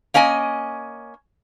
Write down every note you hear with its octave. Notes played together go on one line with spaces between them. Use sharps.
A#3 C#4 D#5 G#5